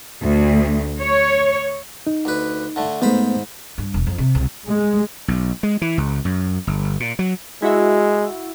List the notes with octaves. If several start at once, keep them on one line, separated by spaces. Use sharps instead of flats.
D2
C#5
D#4
D2 B4
D3 A3
G#2 A3 B3 C5 B5
G2
E1
F2
C3
C2
G#3
B1
G#3
E3
C#2
F#2
G1
A#2
F#3
G#3 E4 F#4 E5